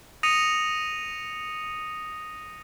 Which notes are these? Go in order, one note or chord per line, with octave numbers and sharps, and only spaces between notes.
D#6 A#6 C#7 D#7 F7